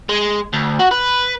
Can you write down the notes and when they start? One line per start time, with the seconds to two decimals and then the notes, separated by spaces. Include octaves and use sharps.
0.09 G#3
0.53 D2
0.79 F#4
0.91 B4